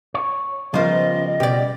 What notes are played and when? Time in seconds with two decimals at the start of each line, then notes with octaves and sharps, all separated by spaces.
0.14 C#5
0.74 C#3 F3 G3 B3 F4 A#4 C5 D#5
1.40 B2 G4 D5